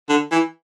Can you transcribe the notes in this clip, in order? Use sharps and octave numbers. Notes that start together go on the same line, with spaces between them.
D3
E3